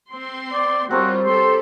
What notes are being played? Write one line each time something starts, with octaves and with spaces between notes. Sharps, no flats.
C4 C6
D5
G3 C4 F4 F#4 A#4 C#5
G4 A4 C6